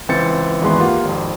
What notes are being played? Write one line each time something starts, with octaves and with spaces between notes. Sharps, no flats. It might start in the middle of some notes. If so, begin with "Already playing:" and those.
C#2 E3 C4 C5 A6 C#7
G#1 E2 E3 G#3 B4 C6
A#3 F4 G4 F#5
G#1 F2